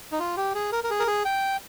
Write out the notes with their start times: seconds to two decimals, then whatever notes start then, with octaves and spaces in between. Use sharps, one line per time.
0.12 D#4
0.20 F4
0.37 G4
0.55 G#4
0.72 A#4
0.84 A#4
0.90 G#4
1.00 A#4
1.07 G#4
1.25 G5